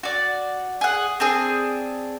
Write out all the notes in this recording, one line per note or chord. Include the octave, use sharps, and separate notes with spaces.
F#4 D5
G#4 F#5
C4 D4 G#4